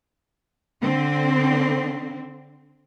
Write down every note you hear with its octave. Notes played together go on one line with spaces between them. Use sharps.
D3 C4